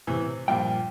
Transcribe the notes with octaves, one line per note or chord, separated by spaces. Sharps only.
A2 C3 E3
C3
G2 A#2 F3 G5